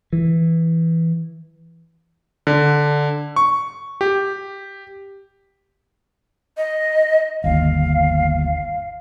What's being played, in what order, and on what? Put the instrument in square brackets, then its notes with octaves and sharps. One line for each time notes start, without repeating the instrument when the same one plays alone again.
[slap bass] E3
[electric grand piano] D3
C#6
G4
[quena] D#5
[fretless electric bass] G1 D#2 [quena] F5